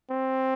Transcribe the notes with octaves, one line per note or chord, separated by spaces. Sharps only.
C4